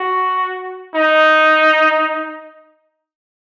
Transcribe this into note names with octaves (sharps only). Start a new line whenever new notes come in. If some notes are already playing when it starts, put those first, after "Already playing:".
Already playing: F#4
D#4